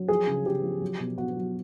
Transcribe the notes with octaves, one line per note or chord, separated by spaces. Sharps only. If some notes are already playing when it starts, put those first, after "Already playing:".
Already playing: F#3
F3 G#4
C#3
C#3 G4
F3
F#3
B2
B2 F#4
F#3